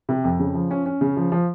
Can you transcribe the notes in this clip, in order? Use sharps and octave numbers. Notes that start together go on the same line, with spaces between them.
C3
F2
C#3
F3
C#4
C#4
C#3
F3
F3